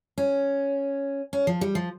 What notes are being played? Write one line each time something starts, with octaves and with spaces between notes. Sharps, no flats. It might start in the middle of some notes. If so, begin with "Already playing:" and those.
C#4
C#4
F3
G3
F3